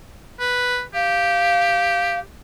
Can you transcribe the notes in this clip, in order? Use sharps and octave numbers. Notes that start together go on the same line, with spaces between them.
B4
G4 F5